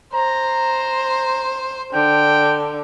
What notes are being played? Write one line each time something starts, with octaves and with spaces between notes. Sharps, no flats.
C5 A#5
D3 G5